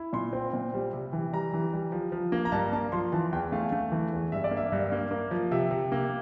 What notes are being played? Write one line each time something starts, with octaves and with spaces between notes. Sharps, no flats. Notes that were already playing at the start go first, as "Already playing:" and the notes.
Already playing: E4
A#2 C6
C4
A#2
G3
C3
E3
G3 A#5
E3
G3
F3
F3
A#3
A#5
G2 A5
A#3 A5
F3 C6
E3 A5
E2 G5
A3 F5
A3
E3
E2
G2 E5
D5
A#3
E5
G2
A#3
A#3
F3
C3 E5
C3
A#3